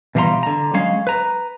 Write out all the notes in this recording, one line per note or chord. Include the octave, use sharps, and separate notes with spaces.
B2 E3 G3 F5 A#5 C6
D3 A#5
F#3 G#3 C#4 C#5 F5
B4 A#5